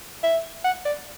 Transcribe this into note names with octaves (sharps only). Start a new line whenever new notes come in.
E5
F#5
D5